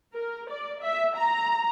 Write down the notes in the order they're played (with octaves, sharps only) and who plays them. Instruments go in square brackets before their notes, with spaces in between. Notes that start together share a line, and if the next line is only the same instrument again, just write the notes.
[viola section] A#4
D5
E5
A#5